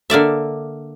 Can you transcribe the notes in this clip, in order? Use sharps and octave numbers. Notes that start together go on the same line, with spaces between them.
D3 A#3 D5 E5